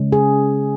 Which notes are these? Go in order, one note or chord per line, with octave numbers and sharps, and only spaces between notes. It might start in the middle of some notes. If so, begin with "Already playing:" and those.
Already playing: C#3 G#3 C#4
G#4